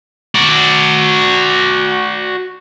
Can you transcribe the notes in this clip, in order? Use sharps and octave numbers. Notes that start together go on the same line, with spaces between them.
F#4 D5